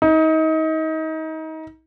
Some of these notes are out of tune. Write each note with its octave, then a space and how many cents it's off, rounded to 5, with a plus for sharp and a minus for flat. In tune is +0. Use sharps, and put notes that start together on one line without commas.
D#4 +30